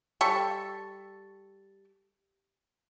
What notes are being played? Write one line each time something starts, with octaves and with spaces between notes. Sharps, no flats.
G3 A4 C#6